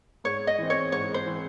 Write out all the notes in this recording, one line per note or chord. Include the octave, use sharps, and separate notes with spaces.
G#2 C#5
D#5
E3 C4
C#5
G#2 C#5
C5
E3 C4